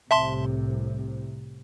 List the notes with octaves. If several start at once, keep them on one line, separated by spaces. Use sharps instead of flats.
C2 A2 C3 E5 A5 C6